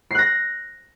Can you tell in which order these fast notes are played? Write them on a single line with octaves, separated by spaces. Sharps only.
C7 F#6 A#6